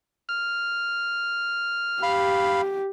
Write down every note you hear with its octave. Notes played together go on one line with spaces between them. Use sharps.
F6
G4 F5 B5